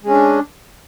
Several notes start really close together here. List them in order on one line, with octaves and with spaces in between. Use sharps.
G#3 C#4 D4